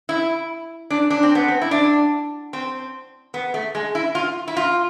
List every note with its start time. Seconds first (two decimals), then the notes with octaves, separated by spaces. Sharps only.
0.09 E4
0.90 D4
1.10 D4
1.23 C4
1.35 B3
1.48 C4
1.62 E4
1.71 D4
2.53 C4
3.34 B3
3.54 A3
3.75 G#3
3.95 E4
4.15 F4
4.48 E4
4.57 F4